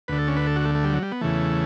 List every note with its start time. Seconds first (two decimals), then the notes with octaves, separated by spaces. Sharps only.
0.08 D2 D3 B4
0.19 A4
0.28 C#4
0.37 B4
0.47 A4
0.56 F#4
0.64 A3
0.75 A3
0.84 G3
0.93 F#3
1.02 G3
1.12 B3
1.21 E2 C#3 E3 A3